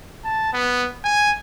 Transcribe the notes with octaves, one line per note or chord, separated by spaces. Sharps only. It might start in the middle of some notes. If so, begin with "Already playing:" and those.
A5
B3
G#5